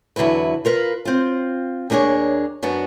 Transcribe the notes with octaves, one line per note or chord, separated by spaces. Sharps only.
E2 D3 F#3 E4 B4
F4 A#4 B4 F5
C4 F4
D#2 A#3 D4 G#4 C#5
F#2 B3 D4 F#4